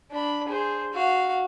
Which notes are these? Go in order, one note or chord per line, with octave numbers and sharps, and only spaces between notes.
D4 B5
G#4 C5
F#4 F5